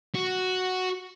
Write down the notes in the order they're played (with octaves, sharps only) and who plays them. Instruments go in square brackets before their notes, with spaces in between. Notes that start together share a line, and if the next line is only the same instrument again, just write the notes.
[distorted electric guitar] F#4